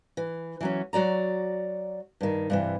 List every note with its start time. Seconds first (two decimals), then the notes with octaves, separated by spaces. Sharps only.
0.17 E3
0.61 E3 F#3 C#4
0.93 F#3 F#4 D5 A#5
2.21 G2 D#3
2.50 G2 C3 E3